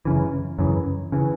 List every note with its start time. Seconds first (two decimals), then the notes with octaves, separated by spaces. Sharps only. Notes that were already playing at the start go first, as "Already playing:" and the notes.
0.05 F#2 C#3 E3
0.59 F#2 C#3 E3
1.12 C#3 E3